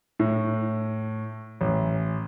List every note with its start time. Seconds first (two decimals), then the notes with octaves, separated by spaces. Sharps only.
0.19 A2
1.61 A1